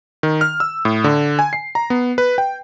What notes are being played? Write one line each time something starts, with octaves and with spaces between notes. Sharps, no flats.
D#3
F6
E6
A2
D3
G#5
C7
A#5
B3
B4
G5